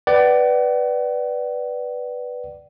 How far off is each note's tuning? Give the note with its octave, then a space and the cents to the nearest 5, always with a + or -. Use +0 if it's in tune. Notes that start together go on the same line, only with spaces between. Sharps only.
B4 +0 D5 +5 F#5 +40